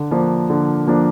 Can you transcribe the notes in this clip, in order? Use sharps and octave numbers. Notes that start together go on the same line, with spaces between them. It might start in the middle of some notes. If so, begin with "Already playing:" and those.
Already playing: D3
F3 A#3 D4
D3
F3 A#3 D4